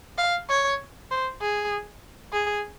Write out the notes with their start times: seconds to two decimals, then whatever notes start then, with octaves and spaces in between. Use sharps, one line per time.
0.18 F5
0.49 C#5
1.11 C5
1.41 G#4
2.33 G#4